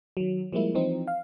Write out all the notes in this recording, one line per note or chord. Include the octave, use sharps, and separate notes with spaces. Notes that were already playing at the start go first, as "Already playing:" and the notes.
D#3 F#3
F3 G3 G#3 A#3 E4
E3 F3 C4 D#4
F5